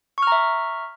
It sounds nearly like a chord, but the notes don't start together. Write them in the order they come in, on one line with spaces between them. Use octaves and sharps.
C#6 F6 A#5 E5